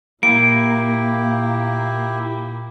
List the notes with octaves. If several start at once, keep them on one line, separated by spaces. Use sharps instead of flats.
A#2 A#3 E4 G4 D7